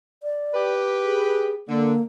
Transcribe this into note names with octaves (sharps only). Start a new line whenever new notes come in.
D5
G4 B4
G#4
D3 A#3